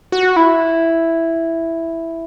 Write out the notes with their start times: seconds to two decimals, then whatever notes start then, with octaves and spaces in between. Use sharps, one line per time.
0.12 F#4
0.36 E4